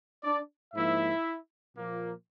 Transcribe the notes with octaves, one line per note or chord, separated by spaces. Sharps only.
D4 D5
G#2 F3 A#3 E4 E5
A#2 F3 A#3